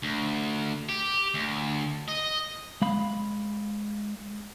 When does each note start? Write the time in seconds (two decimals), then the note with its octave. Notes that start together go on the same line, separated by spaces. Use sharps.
0.03 D2
0.89 G4
1.34 D2
2.09 D#5
2.82 G#3 F5 B5